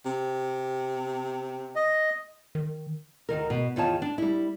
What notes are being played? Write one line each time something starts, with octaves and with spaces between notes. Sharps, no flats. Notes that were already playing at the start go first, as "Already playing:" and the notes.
C3
D#5
D#3
D2 B2 D#3 A#4
B2
E2 D#3 F4 C#5 A5
D4
G3 E4